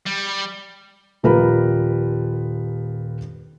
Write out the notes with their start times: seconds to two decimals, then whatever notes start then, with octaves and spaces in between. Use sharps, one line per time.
0.06 G3
1.23 D#1 F3 G3 A#4 B4 B5